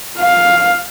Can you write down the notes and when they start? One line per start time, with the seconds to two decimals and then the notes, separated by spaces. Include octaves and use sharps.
0.18 F5